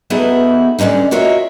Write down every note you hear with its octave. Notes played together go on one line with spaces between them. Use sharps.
B3 D#4 E4 F#4 G#4 A4
D3 G3 G#3 C#4 D#4
F4 F#4 A#4 C#5 D#5 E5